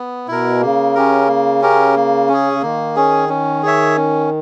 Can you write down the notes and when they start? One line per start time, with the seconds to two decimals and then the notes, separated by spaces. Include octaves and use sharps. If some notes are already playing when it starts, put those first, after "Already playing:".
Already playing: B3
0.28 B2 E4 A#4
0.61 C#3 A#3
0.95 C#4 G4 A#4
1.28 A#3
1.62 C#4 G4 A#4
1.95 A#3
2.29 C#4 G#4
2.52 C#3
2.62 D#3 A#3
2.96 C#4 G#4
3.29 C#4
3.63 G#4 C#5 E5
3.96 C#4